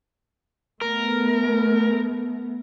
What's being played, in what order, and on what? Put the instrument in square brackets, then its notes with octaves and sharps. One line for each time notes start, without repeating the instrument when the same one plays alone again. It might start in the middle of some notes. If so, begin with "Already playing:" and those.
[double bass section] A3 B3 [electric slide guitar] A#4